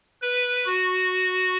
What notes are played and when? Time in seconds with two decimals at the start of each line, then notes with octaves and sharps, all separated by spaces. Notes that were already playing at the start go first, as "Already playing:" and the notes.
0.22 B4
0.66 F#4